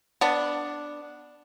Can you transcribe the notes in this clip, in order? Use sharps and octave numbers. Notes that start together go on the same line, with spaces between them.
B3 D4